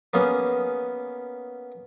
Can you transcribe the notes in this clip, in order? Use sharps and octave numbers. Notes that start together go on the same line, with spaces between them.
A#3 B3 C#4 G#4